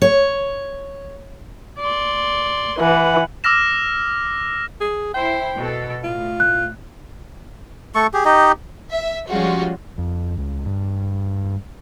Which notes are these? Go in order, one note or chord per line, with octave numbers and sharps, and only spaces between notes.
C#5
D5 C6
E3 B4 F#5
D6 E6 F6 A#6 E7
G#4
E4 C5 G5
B2 A4
A2 F4
F#6
A3 A4 C#6
G4 G#4
D#4 G4 D#5
E5
F3 G3 G#3 C#4 F4 F#4
F2
C#2
G2